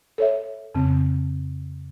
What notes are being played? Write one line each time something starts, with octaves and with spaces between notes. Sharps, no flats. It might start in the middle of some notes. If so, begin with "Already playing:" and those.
A4 C#5 E5
F2 C#3 C4